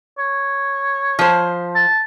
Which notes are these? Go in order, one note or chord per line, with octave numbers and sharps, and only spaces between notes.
C#5
F3 C5
A5